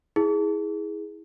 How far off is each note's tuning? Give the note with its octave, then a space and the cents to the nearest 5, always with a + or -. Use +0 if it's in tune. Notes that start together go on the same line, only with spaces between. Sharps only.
E4 -25 G#4 +0